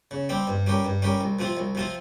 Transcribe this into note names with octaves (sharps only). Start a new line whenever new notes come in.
C#3
G3 C4 G4
G2
G3 C#4 G4 A#4
G2
G3 C#4 G4 A#4
C2
C3 F3 C4 F4
C2
C3 F3 C4 F4